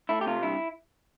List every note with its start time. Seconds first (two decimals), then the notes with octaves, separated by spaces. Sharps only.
0.09 A3 E4
0.21 G4
0.26 C3 F4
0.43 G2 E4